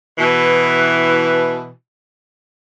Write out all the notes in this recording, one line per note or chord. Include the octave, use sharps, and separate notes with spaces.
B2 E3